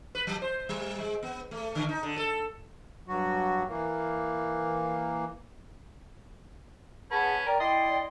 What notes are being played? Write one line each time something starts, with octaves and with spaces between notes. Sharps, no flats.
B4
F#3
C5
G3
G#3
B3
A3
D3
D#4
D3
A4
G2 F#3 F#4
E3 A#3
C#4 G#4 B4 F#5 A5
A#4 D5 G5
E4 D#5 G5 C6